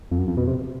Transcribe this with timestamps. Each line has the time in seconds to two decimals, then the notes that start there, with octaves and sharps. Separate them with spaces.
0.11 F2
0.18 F#2
0.28 F2
0.37 B2
0.47 C3